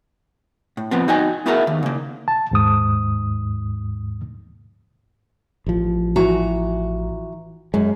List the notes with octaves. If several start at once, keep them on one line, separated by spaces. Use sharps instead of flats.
A2
F3 B3 C4
D#4 F#4 D#5 G5 G#5
B3 E4 F#4 G#4 A#4 E5
D#2
C#3 A#3
A5
D#2 G#2 D#6
A1 F3
E3 F#4 A#5
F#2 G#3